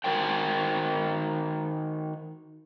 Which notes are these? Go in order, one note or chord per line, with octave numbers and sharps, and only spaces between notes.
D#3 F#4 A#4 C5 G5